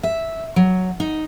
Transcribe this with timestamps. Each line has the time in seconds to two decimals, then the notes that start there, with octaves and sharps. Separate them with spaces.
0.03 E5
0.56 F#3
1.00 D#4